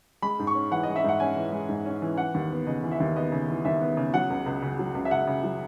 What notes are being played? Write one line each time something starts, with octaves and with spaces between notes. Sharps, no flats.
G#3 B5
G#2
C#6
C#4
E3 F#5
G#3 D#5
E5
G#2 F#5
C#4 G#5
E3
G#3
G#2
C#4
E3
E3 F#5
D#2
B3
C#3 D#5
E3
E5
D#2
B3 D#5
C#3
E3
D#2 E5
B3
C#3
F#3 F#5
C#2
C#2
C#3
F#3
C#2
E5
C#2 F#5
C#3
F#3